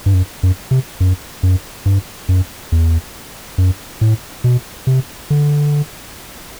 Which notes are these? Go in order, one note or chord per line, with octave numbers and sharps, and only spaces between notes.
G2
F#2
F#2
C3
F#2
F#2
G2
F#2
E2
F#2
A2
B2
C3
D3